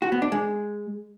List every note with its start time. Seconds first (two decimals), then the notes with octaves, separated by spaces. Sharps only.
0.02 F#4
0.12 B3
0.22 D4
0.32 G#3